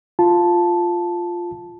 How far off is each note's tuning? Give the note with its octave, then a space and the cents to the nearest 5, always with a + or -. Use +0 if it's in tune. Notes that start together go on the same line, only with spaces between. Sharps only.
F4 +0 A5 -5